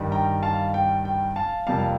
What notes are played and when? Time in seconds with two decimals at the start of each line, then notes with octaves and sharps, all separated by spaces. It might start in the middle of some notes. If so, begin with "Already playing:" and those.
Already playing: G2 D#3 G3
0.12 G5 A#5
0.43 F5 A5
0.74 G5
1.05 G5
1.36 F5 A5
1.67 F2 C3 G3 A#3 F5 A5